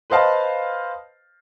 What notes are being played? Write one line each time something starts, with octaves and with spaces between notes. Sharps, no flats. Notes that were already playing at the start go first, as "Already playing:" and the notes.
B4 C5 D#5 F5 A5